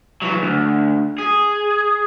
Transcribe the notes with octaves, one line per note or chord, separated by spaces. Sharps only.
E3 F#3
D2
G#4